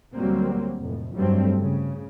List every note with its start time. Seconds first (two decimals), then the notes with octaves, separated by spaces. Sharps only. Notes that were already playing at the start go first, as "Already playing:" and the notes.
0.15 D2 F#3 G3 A#3 C4
0.82 F1 A2
1.15 F1 G2 F#3 G3 A3 C4
1.59 C#3